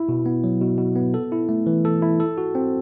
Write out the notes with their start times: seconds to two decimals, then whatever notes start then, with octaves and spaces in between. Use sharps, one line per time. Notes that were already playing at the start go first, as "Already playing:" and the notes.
Already playing: E4
0.09 B2
0.26 B3
0.44 F#3
0.61 B2
0.78 B2
0.96 B3
1.14 A4
1.32 E4
1.49 A3
1.66 E3
1.85 A4
2.02 E4
2.20 A4
2.38 F#4
2.55 C4